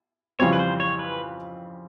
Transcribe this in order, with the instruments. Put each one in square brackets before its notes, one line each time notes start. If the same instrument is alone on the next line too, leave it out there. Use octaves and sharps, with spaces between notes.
[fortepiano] F2 C#3 E3 G3 C4 [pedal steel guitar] C#5
[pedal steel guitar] B4
C5
C#5
B4